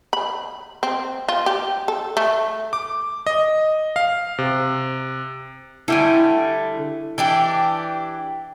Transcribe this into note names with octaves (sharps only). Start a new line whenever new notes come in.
B5
C4
F4
G4
A4
A3
D6
D#5
F5
C3
D3 G3 A3 E4 G5 G#5
E3 D4 G4